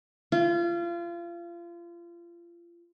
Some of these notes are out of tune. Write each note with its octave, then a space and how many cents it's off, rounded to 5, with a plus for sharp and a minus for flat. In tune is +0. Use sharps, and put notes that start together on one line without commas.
F4 -30